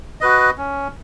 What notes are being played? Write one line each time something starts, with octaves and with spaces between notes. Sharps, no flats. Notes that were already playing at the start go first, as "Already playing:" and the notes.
F#4 B4 D#5
C#4